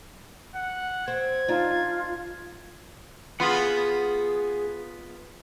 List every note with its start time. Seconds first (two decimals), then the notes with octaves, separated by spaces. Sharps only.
0.56 F#5
1.08 C4 G#6
1.48 D4 D#4 F4
3.40 B3 F4 G#4 F#5